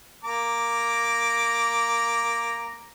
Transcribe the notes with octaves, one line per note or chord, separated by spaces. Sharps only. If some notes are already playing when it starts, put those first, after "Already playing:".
A#3 A#5 D6